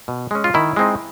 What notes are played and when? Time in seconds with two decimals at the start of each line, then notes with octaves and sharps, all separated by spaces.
0.08 B2
0.31 G#3 C#4
0.44 F4
0.54 D#3 E4
0.76 G#3 C4 D#4